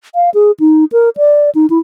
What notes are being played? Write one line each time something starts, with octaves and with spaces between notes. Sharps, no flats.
F5
G#4
D#4
A#4
D5
D#4
E4